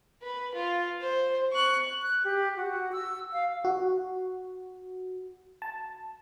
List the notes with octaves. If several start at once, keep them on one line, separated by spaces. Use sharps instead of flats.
B4
F4
C5
C#6 F#6
F#6
G4
F#4
E6
F5
F#4
A5